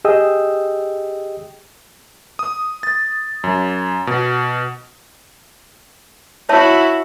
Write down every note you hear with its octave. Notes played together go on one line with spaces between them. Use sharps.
G4 G#4 D#5 G5 D#6 E6
D#6
A6
F#2
B2
E4 F#4 C#5 E5 A5